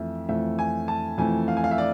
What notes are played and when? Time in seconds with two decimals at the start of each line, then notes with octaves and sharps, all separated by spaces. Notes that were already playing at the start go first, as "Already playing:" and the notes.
Already playing: F2 E3 A3 E5
0.29 F2 E3 A3 E5
0.59 G#5
0.88 A5
1.18 F2 E3 A3 G#5
1.48 F5
1.57 G#5
1.64 F5
1.71 E5
1.78 D5